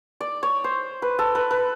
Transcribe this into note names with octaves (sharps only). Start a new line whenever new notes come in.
D5
C#5
C5
B4
A4
B4
B4